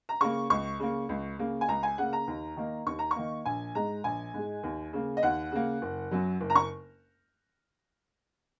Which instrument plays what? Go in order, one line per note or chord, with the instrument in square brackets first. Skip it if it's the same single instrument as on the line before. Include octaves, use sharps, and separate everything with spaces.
[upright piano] A#5
C#3 A#3 C#6
C#2 C#6
C#3 A#3
C#2
C#3 A#3
G#5
C#2 A#5
G#5
C#3 A#3 F#5
A#5
D#2
D#3 A#3
D#2 C#6
A#5
C#6
D#3 A#3
A#1 G#5
G#2 G#3 A#5
A#1 G#5
G#2 G#3
D#2
C#3 A#3
D#5
D#2 F#5
C#3 A#3
F#1
F#2 F#3
F#1
A#5
C#6